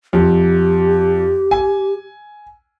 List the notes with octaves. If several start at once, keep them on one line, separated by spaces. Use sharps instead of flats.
F2 G4
G#5